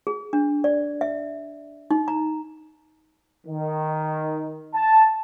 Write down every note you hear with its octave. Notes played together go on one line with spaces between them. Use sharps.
G#4
D4
D5
E5
D#4
A#5
D#3
A5